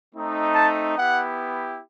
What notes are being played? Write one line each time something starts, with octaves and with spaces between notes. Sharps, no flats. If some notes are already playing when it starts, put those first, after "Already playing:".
A3 C4 D#4
A5
B3 E4 G4 F#5